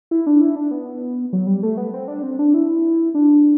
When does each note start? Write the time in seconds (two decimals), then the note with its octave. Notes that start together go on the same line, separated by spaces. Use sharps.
0.11 E4
0.27 D4
0.41 E4
0.56 D4
0.71 B3
1.33 F#3
1.47 G3
1.63 A3
1.77 B3
1.93 C4
2.08 D4
2.23 C4
2.39 D4
2.54 E4
3.14 D4